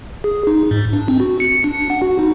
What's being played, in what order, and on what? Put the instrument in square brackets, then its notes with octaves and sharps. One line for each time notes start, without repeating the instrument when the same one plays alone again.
[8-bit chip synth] G#4
D#4
G#2
D4
C4
F#4
C#7
D4
F#5
F#4
D#4